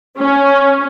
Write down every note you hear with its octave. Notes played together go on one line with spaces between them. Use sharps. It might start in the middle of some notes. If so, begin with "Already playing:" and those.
C#4